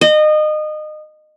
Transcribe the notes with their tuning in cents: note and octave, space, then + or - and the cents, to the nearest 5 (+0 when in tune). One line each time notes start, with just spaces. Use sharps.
D#5 -25